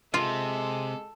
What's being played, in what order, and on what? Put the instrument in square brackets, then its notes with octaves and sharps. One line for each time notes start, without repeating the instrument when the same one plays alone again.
[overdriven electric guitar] C3 [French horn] G#3 [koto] F4 [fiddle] A4